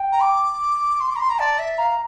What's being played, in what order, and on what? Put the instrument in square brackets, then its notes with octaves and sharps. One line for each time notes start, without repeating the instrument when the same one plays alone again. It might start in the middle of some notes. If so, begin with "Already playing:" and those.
Already playing: [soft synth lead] G5
[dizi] A#5
D6
C6
D6
A#5
C6
A#5
[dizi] D5 [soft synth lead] A5
[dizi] E5
[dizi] F5 [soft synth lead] A#5